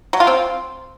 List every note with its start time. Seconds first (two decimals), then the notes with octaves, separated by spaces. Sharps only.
0.13 F#3
0.20 F4
0.27 C4